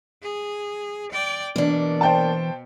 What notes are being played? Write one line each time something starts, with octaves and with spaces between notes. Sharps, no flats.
G#4
D5 G5
B2 E3 A#3 D4
C5 G5 A5